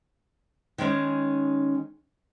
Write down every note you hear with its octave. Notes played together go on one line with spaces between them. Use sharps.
D#3 G#3 C#4 D#4